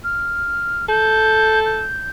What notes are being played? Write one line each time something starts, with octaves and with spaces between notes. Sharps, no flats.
F6
A4 G6
G6